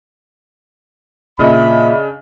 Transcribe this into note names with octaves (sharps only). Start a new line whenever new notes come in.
A#2 C#3 D4 D#5 E5 B5